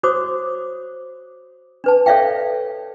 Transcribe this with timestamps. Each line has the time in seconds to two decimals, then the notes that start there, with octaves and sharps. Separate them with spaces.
0.03 F#4 C5 C#5 D6 D#6
1.84 D4 B4 A5
2.06 A4 C#5 D5 E5 F5 G5